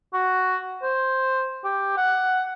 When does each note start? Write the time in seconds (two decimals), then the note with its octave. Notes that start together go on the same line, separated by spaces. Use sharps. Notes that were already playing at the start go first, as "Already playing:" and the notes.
0.14 F#4
0.82 C5
1.64 G4
1.97 F#5